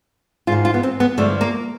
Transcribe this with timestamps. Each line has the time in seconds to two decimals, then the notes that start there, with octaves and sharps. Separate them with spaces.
0.47 G#2 D#3 F4
0.65 F4
0.74 B3
0.83 C4
1.00 B3
1.17 G2 D3 F3 A3
1.41 A#3